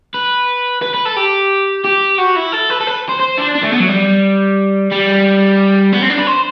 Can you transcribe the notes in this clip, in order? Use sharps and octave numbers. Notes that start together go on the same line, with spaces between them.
B4
B4
B4
A4
G4
G4
F#4
E4
A4
B4
A4
B4
C5
C5
D4
D4
A3
B3
F#3
G3
G3
B3
C4
D4
B4
C5